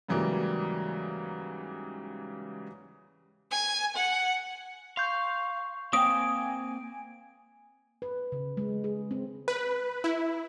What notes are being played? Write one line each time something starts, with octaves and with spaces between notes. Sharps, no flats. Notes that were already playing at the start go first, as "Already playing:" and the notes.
G#2 C#3 E3 F#3 G3 A#3
G#5
F#5
F5 C6 C#6 G6
A#3 C4 G5 G#5 D#6 D7
B4
C#3
G#3
G#4
C4
B4
E4